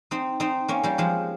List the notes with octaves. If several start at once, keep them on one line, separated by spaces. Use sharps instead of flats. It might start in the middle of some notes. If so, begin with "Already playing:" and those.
C4 D#4
C4 D#4
A#3 C#4
G3 A#3
F3 G#3